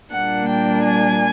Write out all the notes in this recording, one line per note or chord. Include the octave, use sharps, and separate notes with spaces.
A#2 G3 A#3 D4 F#5
G5
G#5